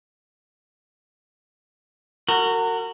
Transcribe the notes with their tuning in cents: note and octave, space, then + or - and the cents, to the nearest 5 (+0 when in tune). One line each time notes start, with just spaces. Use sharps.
F#4 +0 A#4 -35